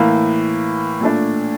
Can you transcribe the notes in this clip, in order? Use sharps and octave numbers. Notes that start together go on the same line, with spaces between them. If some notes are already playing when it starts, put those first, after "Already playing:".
Already playing: A2 E3 A#3
A#2 A3 D4